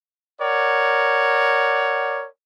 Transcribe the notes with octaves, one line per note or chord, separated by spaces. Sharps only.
A#4 C#5 D5 F#5